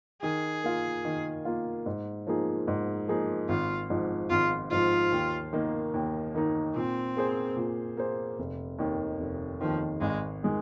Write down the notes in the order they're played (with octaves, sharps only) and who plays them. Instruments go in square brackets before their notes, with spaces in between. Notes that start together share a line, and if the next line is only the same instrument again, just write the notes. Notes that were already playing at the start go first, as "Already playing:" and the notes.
[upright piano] D#3 [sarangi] G#4
[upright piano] A#3 F4
D#3
A#3 F4
G#2
F3 A#3 D#4 G#4
G#2
F3 A#3 D#4 G#4
[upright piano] G#1 [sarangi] F4
[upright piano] G#2 F3
[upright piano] G#1 [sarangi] F4
[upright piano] G#2 F3 [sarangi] F4
[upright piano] D#2
D#3 A#3 D#4
D#2
D#3 A#3 D#4
[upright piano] A#2 [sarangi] C4
[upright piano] A#3 G#4 C5
A#2
A#3 G#4 C5
F1
D#2 D#3
F1
[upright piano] D#2 D#3 [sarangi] F3
[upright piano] G#1 [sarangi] G#3
[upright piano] D#3 G#3